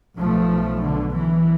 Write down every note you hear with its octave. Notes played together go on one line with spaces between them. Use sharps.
B1 B2 F3 A3
D3
E3